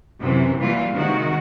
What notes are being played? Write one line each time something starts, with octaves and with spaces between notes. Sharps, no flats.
F#2 C3 E3
E3 F#3 G3 A#3 F4
C3 D#3 G#3 F#4